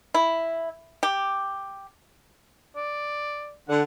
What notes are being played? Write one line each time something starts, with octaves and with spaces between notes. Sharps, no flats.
E4
G4
D5
D3 F#5